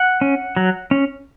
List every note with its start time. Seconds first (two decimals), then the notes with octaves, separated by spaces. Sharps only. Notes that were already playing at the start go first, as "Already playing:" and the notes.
Already playing: F#5
0.21 C#4
0.56 F#3
0.91 C#4